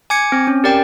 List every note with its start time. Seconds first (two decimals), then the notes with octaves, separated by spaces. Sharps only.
0.10 G#5 D6 G#6 C#7
0.32 C4
0.47 C#4
0.64 G4 A#4 D5 G5